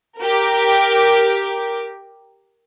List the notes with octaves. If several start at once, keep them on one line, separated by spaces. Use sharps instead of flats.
G4 A#4